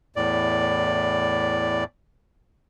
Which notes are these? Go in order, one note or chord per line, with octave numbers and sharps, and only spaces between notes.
E2 A2 D5